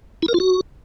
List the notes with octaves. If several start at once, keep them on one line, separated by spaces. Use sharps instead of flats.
E4
A#4
F4
F#4